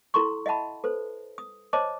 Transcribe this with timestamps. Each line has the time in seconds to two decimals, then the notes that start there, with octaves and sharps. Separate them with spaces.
0.14 E4 A4 A#5 C6 C#6
0.46 D#5 E5 F#5 A5 B5
0.84 A4 B4 C5
1.38 D#6
1.73 C5 C#5 D#5 A5 D6